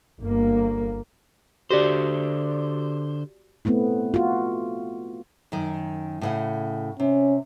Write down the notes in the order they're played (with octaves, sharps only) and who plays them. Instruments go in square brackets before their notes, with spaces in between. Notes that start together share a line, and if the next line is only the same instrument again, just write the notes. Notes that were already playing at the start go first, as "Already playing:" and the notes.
[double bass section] G1 A#3
[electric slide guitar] D3 C5 [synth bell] F#4 G4 D5
[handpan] A3 B3 C4 E4
F4 F#4
[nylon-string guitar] F#2 D#3
A2 C#3 F#5
[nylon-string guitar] C3 [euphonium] C#4